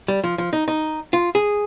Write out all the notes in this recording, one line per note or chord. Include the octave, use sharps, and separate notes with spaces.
G3
F3
F3
D#4
D#4
F4
G#4